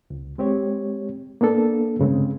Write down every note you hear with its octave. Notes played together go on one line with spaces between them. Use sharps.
C#2
G#3 C4 G4 C#5
A#3 B3 D4 A4
G2 C#3 G#3 C4